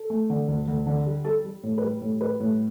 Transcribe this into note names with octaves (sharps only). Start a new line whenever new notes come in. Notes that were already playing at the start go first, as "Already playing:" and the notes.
Already playing: A4
A3
D3
D2
D2
D3
G3
G3 A4
G3
A2
B4
G3
A2
G3 B4
A2